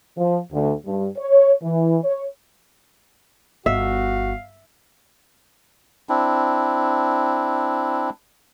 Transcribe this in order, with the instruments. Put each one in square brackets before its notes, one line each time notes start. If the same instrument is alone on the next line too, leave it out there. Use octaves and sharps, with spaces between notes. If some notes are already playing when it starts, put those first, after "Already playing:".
[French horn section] F3
D2
G2
C#5
E3
C#5
[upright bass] G1 [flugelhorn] F#4 [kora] E5 [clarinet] F5
[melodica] C4 D4 E4